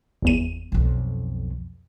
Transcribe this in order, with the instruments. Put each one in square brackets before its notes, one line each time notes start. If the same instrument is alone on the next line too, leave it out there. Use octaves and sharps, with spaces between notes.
[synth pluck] G1 E2 D#7
[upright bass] B1 F2